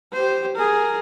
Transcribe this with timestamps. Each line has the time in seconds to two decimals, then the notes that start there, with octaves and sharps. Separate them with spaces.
0.13 G4 C5
0.56 G#4 A#4